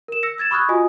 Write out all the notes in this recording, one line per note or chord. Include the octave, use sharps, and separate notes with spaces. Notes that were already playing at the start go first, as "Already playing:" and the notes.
A#4 E7
E6 A#6 C#7
E6 G#6 A6 E7
B5 C#6 D#6 F6 F#6 G#6
F4 F#4 D#5 G#5 D#6